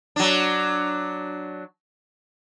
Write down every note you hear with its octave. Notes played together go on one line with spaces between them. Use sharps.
F#3 D4